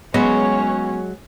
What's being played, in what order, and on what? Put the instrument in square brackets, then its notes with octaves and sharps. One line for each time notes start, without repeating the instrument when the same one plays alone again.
[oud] F#3 G#3 [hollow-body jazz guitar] B3 [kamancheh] C#4 C#5